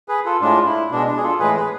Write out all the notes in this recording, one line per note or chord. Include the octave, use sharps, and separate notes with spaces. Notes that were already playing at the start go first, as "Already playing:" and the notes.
G#4 B4
F4 A4
A2 G#3 D4 F4
E4
B2 G#3 D4
D4
G#4
F4 A4
A2 E3 G#3 G#4 B4
G#4 B4